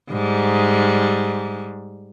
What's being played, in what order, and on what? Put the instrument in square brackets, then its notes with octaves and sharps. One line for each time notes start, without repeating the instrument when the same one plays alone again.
[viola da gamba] G#2 G3